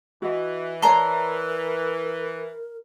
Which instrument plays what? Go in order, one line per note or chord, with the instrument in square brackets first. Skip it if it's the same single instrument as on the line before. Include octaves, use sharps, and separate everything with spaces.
[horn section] E3 [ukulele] F#4 D#5
[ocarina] A#4 [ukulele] C#5 D5 A5 [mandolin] A#5 C6